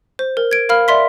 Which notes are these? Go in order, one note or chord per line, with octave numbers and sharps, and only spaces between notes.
C5
A#4
G#6 D7
A#4 F5 B5 F6
D5 E5 C6 B6